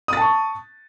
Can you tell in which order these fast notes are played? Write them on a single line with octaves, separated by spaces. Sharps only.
D#6 A6 A5 C#6